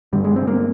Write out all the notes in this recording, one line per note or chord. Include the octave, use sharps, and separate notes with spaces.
G2 D3 G3
G#3
C4
A#3